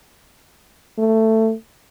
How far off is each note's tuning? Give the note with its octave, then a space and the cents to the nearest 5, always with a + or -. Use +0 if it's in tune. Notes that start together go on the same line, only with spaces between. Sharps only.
A3 +15